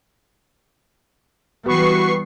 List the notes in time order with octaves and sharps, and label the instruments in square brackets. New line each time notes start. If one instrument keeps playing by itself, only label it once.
[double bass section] E3 G3 B3 [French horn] F#4 [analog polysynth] B4 C#6 C7